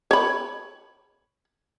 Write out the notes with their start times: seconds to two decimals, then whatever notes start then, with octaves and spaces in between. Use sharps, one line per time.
0.11 C#5 B5